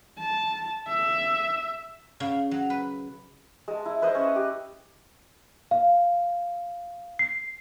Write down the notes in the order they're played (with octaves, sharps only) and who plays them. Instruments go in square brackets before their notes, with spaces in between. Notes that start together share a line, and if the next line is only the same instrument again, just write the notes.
[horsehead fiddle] A5
E5
[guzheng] C#3
F#3
B4
[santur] G#3 A5
E4
E4 B4 C5 D#5
C#4
G4
[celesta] F5
C7